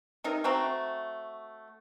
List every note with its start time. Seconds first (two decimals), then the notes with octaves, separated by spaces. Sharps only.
0.24 C3 D#4 A#4
0.44 A3 C4 F#4 A#5